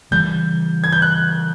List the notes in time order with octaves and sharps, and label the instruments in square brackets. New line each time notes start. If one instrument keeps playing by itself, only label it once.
[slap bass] C#3 E3 G3 [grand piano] G6
[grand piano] G#6
G6
F#6